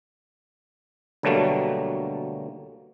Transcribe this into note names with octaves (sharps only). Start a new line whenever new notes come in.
D2 B2 F#3 G3 A3 A#3